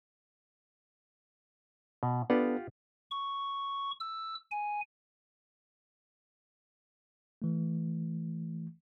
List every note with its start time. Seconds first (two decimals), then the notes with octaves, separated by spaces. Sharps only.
2.03 B2
2.30 B3 D4 F4 G4 A4 F#5
3.11 C#6
4.00 E6
4.51 G#5
7.42 E3 A3